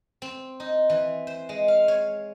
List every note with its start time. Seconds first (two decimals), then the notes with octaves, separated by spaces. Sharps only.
0.22 C4
0.60 D#4
0.90 E3
1.27 C5
1.49 G#3
1.68 F5
1.88 C#5